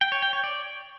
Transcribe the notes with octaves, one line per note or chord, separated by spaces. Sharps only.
G5
C#5
G5
C#5
D5